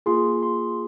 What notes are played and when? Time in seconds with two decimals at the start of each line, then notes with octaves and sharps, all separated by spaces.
0.06 A#3 F4 G#4 C6
0.43 C6